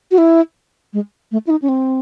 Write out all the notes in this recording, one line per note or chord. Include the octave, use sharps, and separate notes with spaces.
F#4
E4
G#3
A3
E4
D#4
C#4
C4